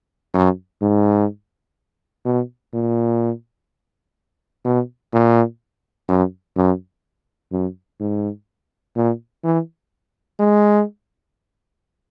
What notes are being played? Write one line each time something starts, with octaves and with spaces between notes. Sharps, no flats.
F#2
G#2
B2
A#2
B2
A#2
F#2
F#2
F#2
G#2
A#2
E3
G#3